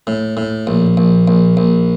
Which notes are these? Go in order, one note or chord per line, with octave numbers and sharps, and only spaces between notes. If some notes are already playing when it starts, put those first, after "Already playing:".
A2
A2
A#1
A#1
A#1
A#1